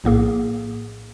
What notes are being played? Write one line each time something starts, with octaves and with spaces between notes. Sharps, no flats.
A#1 A2 A#3 G#4